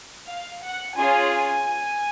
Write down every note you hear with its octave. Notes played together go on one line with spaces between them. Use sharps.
F5
F#5
C#4 F4 G#4 G#5
G#5